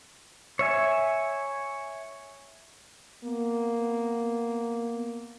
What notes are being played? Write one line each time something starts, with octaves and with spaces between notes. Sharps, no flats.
C#5 E5 G#5
A#3 B3